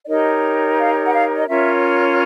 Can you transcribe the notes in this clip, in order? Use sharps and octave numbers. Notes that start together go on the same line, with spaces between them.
D5
D#4 G4 A#4 C#5 D#5
F5
F#5
F5
D#5
C#4 F4 A#4 C#5 E5